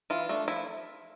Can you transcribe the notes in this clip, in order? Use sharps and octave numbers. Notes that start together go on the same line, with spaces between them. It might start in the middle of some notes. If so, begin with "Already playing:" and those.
E3 F4
A3 D4
F3 E4